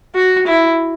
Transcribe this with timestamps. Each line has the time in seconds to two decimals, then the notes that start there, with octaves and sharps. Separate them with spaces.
0.15 F#4
0.47 E4